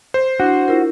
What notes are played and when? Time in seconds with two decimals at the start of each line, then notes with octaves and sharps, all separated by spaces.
0.14 C5
0.40 D4 E4 F#4
0.68 E4 F4 A#4